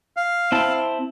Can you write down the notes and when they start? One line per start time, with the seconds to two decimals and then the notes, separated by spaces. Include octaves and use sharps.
0.17 F5
0.52 C4 E4 A5